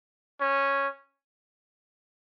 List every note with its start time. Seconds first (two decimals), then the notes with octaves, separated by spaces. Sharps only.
0.41 C#4